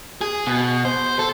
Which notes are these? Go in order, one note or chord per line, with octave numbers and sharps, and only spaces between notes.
G#4
B2
C5
A4